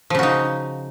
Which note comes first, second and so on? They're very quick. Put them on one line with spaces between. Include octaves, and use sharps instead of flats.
F3 C#3 F#4 D#4